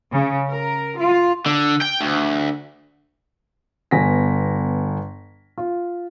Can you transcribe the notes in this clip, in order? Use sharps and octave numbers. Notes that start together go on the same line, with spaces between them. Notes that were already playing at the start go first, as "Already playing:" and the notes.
C#3
A#4
F4
D3
G5
D2
G1 B3 G#5 A#6 B6
F4